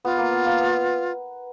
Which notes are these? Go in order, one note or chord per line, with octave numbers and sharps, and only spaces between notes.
B3 F4
A#3
B3
A#3
B3